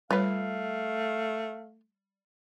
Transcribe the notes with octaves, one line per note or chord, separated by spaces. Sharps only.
G3 A3 F4 B4 C#5 F5